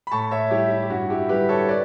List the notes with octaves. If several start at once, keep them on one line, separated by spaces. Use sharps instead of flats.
B5
A2 A5 C#6
C#5 E5
G3 E4 G4
E4
G4
G2 F#4
E4 G4
D3 G3 G4 B4
A4 C#5
B4 D5